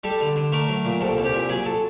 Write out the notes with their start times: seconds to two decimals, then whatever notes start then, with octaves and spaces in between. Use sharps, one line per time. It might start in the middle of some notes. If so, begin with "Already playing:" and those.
0.04 G3 A4
0.20 D3
0.36 D3
0.52 A3 A#4
0.68 F#3
0.85 A#2
1.01 C2 A4
1.17 C2
1.25 G4
1.33 A#2
1.49 F#3 G#4
1.65 A4